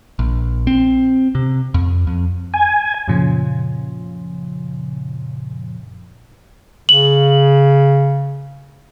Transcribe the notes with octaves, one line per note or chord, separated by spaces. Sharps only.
A#1
C4
C3
F2
F2
G#5
F#2 A#2 C#3 F3
C#3 F#7